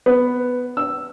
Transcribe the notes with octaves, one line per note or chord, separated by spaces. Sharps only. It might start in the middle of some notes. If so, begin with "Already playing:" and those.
B3
E6